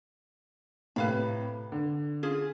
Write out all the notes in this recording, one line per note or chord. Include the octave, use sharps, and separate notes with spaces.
A2 C3 B4 F5 B5
D3
C#4 F4 G#4